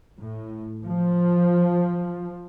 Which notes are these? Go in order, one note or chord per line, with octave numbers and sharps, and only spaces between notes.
A2
F3